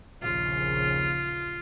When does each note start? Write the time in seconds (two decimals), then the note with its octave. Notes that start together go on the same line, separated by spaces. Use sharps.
0.22 A#1 D#2 C#3 F4